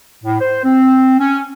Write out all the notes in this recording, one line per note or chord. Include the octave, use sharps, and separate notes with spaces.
A2
C5
C4
C#4